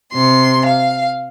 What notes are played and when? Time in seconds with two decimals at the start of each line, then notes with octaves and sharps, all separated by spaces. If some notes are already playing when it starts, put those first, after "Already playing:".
0.13 C3 C6
0.66 F5